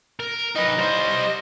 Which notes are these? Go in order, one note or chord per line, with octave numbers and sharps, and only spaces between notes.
A#4
D#4 B4 D#5
G3 C5